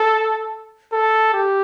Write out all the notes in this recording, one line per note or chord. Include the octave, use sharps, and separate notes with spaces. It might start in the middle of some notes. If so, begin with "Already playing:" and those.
Already playing: A4
A4
G4